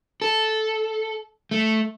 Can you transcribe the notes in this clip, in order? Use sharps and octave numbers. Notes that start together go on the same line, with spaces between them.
A4
A3